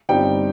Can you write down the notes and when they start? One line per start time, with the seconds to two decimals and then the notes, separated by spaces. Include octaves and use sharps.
0.09 G1 G2 G3 C4 D#4 G5